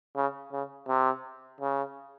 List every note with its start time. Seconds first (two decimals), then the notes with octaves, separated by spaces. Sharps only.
0.16 C#3
0.52 C#3
0.88 C3
1.61 C#3